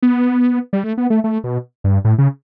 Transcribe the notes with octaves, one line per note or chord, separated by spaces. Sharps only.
B3
G3
A3
B3
A3
A3
B2
G2
A2
C#3